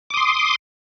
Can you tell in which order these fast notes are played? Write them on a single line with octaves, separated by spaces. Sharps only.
D6 D#6 C6